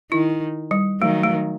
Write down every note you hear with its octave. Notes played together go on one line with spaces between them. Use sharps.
D#3 E4
G3
D#3 F#3 A3
A3